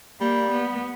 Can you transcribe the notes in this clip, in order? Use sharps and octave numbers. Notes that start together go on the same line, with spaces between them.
G3 A#3
B3